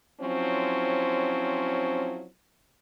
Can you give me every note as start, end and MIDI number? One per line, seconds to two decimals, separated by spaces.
0.21 2.26 53
0.21 2.26 54
0.21 2.26 60
0.21 2.26 61
0.21 2.26 64